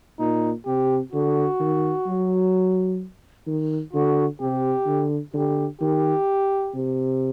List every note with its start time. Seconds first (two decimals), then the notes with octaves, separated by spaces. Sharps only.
0.19 A#2 D#4
0.66 C3 G4
1.13 D3 F#4
1.60 D#3
2.07 F#3
3.47 D#3
3.93 D3 F#4
4.41 C3 G4
4.87 D3
5.34 D3 G4
5.81 D#3 G4
6.74 C3